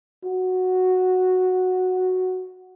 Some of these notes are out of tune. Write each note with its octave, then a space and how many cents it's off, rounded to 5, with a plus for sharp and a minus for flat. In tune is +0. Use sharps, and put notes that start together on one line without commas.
F#4 -5